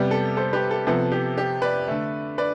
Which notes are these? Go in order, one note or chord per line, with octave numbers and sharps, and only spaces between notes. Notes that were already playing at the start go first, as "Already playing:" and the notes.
Already playing: C3 G3 B3 G4
A4
A4 C5
G4 B4
A4
C3 F3 B3 A4
G4
G4
B4 D5
D3 A3
B4 D5